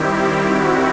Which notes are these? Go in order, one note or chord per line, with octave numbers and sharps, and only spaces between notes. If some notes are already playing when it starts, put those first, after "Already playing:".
Already playing: D#3 G3 C4 E4 G4
F#4